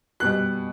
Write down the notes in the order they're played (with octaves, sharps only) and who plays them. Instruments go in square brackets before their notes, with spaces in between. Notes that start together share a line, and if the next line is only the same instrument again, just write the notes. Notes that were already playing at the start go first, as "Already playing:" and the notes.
[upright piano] B2 G3 F#6